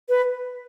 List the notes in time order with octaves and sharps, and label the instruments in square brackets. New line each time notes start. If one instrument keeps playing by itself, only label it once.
[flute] B4